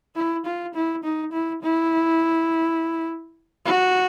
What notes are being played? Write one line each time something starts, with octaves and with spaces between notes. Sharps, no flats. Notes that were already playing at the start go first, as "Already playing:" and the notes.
E4
F4
E4
D#4
E4
E4
F#4